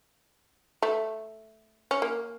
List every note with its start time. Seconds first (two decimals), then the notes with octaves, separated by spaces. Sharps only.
0.83 A3
1.91 C#4
2.02 A#3